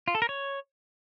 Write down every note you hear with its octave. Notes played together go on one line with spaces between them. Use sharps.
F4
A4
A#4
C#5